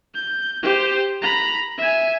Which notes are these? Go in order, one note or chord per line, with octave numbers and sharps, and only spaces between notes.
G6
G4 C5
A#5 B5
E5 G#5